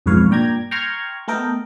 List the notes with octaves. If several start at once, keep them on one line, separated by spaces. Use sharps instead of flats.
B1 F2 G#2 B4 C#5 F5
G2 A#2 D5 G5 A#5 G#6
G5 A#5 C6 C#6 F6 G#6
A3 B3 A4 A#4 D#5 G5